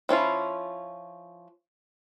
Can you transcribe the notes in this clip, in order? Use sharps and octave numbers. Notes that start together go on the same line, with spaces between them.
F3 C#4 E4 F4